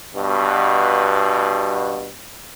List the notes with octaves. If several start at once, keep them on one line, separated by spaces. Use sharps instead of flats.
G2 B2